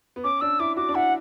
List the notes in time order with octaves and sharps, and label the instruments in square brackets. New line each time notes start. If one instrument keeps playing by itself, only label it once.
[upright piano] B3
[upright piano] C#4 [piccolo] D6
[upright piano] D4 [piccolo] E6
[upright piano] E4 [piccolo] D6
[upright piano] F#4 [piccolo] D6
[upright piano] D4
[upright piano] E4 [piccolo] F#5